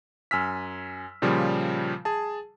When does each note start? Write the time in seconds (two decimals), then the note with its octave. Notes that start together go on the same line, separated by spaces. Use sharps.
0.31 F#2 G#5 E6 F6 B6
1.22 A#2 C#3 F3 G3 F4
2.05 G#4 A5